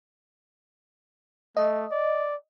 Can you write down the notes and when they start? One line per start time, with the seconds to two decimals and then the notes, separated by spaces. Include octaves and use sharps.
1.57 A3 D#5
1.91 D5